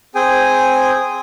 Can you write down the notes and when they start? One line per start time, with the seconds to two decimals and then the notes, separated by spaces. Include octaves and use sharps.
0.15 C4 G#4 G5 G#5